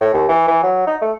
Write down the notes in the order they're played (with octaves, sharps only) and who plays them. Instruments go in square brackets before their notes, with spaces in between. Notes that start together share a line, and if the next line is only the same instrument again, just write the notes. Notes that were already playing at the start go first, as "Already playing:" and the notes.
[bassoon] A2
D#2
E3
E3
F#3
D#4
A3